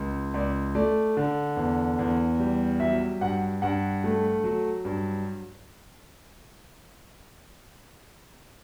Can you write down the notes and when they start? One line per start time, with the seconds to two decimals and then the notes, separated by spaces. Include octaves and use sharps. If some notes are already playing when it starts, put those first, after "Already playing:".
Already playing: C#2
0.34 C#2 D5
0.75 A3 D5
1.17 D3
1.57 E2
1.99 E2
2.39 G3
2.80 F#3 E5
3.21 G2 F#5
3.62 G2 F#5
4.04 A3
4.44 F#3
4.85 G2